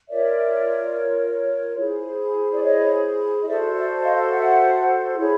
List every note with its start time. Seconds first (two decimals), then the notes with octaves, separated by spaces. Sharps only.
0.09 F4 A#4 C#5 D5 E5
1.78 E4 G#4 C5
2.53 D5
2.63 C#5 D#5
3.42 D#5
3.47 F#4 A4 C5 D5 E5
3.76 D5 E5
4.03 D#5 F5
4.32 E5 F#5
5.16 E4 G#4 C#5